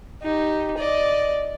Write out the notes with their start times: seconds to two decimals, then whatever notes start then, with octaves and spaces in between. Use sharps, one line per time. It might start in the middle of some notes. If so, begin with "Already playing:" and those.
0.22 D#4 G4
0.78 D5 D#5